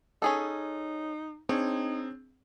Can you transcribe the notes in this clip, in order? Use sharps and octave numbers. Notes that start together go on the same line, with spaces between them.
C#4 D#4 G#4 A4
C4 D4 D#4 G#4 C#5